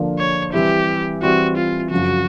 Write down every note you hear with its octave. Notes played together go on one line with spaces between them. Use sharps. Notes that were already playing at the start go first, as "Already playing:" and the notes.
Already playing: D3 F3 A#3 D4 F4
C#5
E3 G3 C4 E4 G4
E3 G3 C4 E4 F#4
F4
F#2 C#3 F3 F#4